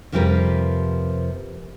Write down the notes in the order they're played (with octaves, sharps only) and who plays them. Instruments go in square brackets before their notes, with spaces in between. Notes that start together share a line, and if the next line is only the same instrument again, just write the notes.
[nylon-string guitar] F2 C3 F3 G3 A#4 B4